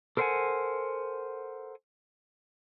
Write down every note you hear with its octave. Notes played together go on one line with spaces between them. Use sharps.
A4 A#4 C5 E5 F#5 G#5